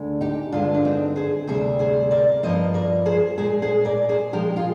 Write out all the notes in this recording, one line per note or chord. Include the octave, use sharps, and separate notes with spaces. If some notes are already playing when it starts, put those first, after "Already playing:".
Already playing: D2 D3 G#3
D#4 G4
G2 D3 G#3 D4 F4
D4
C4 D#4
G#4 C5
D2 C3 G3 G#4 C5
G#4 C5
A#4 D5
G2 F3 A#3 C5 D#5
A#4 D5
G#4 C5
A#2 G#3 G#4 C5
G#4 C5
A#4 D5
G#4 C5
A#2 F3 G#3 G4 A#4
F4 G#4